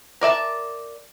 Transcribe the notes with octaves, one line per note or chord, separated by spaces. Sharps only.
A#4 D5 E5 A5